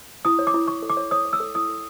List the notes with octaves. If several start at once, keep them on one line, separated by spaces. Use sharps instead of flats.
E4 D#6
C#5
D6
E4
E4 C#6
A4
D6
C#5
C#5 D#6
C#5
E6
A4
E4 D#6
A4